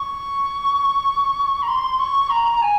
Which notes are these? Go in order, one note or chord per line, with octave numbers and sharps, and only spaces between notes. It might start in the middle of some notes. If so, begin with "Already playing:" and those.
Already playing: C#6
A#5
C6
C#6
A#5
G#5